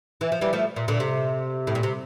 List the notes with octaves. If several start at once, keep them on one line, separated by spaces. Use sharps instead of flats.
E3
F3
E3 G3
F3 A3
A#2
A#2 D3
C3
A2
A#2
C3